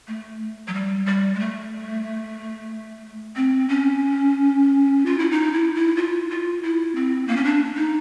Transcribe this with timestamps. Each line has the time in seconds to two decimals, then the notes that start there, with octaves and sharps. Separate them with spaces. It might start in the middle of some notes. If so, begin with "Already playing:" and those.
0.08 A3
0.68 F#3
0.74 G3
1.06 G3
1.35 G#3
1.40 A3
3.36 C4
3.69 C#4
5.06 F4
5.19 E4
5.31 D#4
5.54 E4
5.75 E4
5.97 F4
6.30 F4
6.63 E4
6.95 C4
7.28 A#3
7.37 C#4
7.44 D4
7.77 D#4